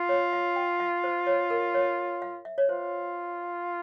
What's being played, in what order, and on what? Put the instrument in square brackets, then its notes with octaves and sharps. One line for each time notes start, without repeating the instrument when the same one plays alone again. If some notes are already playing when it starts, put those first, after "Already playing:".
Already playing: [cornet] F4
[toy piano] C#5
F5
G5
F5
C5
C#5
A#4
C#5
F5
E5
C#5
[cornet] F4 [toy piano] C5